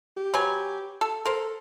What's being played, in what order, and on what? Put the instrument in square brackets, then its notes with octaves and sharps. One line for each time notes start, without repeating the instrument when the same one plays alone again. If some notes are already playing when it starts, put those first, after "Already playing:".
[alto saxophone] G4
[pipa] F#3 B4 G#5
A4
[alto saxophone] A4 [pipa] A#4 C5